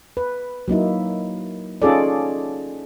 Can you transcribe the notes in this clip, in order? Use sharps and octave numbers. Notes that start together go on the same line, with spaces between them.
B4
F#3 A#3 D#4 E4
C#4 D#4 F4 G#4 A4 D5